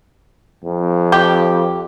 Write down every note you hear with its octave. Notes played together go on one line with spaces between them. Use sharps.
F2
G4